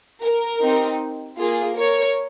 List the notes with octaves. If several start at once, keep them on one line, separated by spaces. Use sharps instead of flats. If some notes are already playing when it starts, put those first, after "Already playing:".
A#4
C4 D#4 G4
A#3 F4 G#4
A#4 C#5